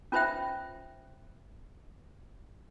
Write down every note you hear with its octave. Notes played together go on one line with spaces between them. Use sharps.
C#4 F4 B4 C5 E5 G5